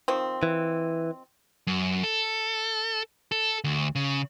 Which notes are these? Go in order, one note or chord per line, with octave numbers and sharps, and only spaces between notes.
D#3 F3 C4
E3
F#2
A4
A4
D2
C#3